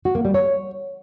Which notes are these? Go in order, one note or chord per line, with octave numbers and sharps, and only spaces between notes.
F#4
A#3
G3
C#5